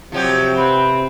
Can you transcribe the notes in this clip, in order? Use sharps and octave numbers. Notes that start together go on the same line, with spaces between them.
C3 F3 F#3 G4
C4 B4